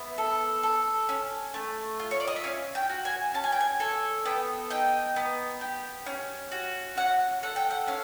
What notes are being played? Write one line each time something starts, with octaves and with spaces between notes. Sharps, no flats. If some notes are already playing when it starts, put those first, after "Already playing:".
Already playing: B3 E4
A4
A4
C#4
A3
F4
C#5
D5
D#5
E5
C#4 F5
G5
F#4
G#5
C#4 A5
G#5
G5
G#5
A4 G#5
B3 G5
D#4 G5
B3
G4
C#4
F#4
C#4 F#5
A4 F#5
G5
F#5
C#4 F5